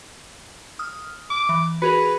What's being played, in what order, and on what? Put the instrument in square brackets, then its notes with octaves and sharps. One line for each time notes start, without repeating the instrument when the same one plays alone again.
[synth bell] D#6 F6
[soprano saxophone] D6
[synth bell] E3
[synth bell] F#4 G#4 A#4 [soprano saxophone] B4